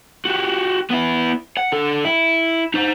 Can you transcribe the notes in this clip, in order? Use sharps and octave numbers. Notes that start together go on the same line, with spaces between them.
F#4 G4
B3 E4
F#5
D3 A4
E4
D#4 C5